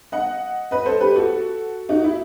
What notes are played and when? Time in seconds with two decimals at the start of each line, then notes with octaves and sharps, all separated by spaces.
0.12 D#5 F#5
0.71 B4 D#5
0.86 A4 C5
1.00 G4 B4
1.16 F#4 A4
1.89 D#4 F#4
2.04 E4